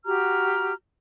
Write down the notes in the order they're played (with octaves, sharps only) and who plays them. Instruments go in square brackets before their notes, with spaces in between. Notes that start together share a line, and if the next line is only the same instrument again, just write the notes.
[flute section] F#4 G4 A#5 F6